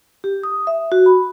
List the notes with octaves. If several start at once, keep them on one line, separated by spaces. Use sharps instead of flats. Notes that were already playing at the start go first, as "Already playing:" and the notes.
G4
D#6
E5
F#4
B5